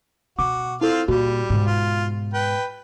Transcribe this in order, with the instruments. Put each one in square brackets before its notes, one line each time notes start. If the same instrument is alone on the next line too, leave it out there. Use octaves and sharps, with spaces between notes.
[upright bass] B2 [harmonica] F#4 [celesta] D6
[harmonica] C4 F4 F5 [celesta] E4 A4
[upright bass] A#2 [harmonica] G3 [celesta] F#4
[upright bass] G#2 B2
[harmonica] F4
B4 G5